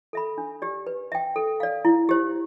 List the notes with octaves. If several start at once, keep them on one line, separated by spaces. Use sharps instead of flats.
A4 E5 B5
D4
G4 D5
B4
E5 G5
A4
D5 F5
E4
G4 C5